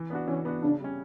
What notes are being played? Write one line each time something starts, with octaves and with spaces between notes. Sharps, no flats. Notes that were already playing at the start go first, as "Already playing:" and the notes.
Already playing: E3
B3 D4 F#4
E3 C#4
B3 D4 F#4
C#3 D4
G3 C#4